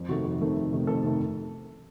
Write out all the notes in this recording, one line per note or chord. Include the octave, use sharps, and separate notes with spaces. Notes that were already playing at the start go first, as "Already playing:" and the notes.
Already playing: F2
C3 D#3 A3 F#4
F2
C3 D#3 A3
F2
C3 D#3 A3
F2 A4
C3 D#3 A3